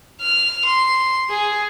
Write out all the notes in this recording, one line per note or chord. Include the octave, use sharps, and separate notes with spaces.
F6
C6
G#4